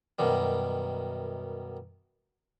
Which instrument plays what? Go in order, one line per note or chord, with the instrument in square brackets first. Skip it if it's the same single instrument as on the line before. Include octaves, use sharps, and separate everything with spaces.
[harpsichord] F#2 B2 D#3 G3